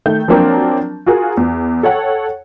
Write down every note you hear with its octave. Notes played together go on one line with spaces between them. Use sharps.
D#3 A3 G6
F3 F#3 A#3 C4 D4 A#4
F4 F#4 G#4 A#4
E2
A4 C#5 F#5 G5